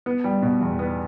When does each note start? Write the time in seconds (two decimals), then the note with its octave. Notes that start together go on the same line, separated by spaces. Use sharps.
0.06 B3
0.24 G3
0.42 B2
0.61 E2
0.79 B3